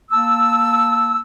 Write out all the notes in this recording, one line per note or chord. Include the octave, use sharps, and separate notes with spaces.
A#3 A5 E6